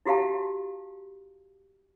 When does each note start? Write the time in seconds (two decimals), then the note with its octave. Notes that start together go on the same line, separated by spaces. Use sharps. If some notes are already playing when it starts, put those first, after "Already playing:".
0.06 E4 F#4 G4 F5 A5